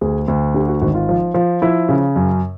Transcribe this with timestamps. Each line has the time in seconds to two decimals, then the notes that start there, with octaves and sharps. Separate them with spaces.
0.01 D2 G#4
0.28 D2
0.54 D3 G4
0.69 F#4
0.81 G#1 F#4
0.95 F4
1.09 F3
1.34 F3
1.62 F3 E4
1.89 C#3
2.16 F#2